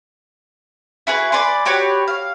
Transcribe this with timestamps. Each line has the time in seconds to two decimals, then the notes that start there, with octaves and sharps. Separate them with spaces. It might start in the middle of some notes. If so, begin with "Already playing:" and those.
1.07 E4 F#4 G#4 B4
1.32 B4 D5 G#5 C6
1.65 F#4 G4 B4 C#5
2.08 F5